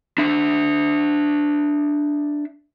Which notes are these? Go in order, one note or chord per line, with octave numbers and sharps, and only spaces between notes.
D4 E5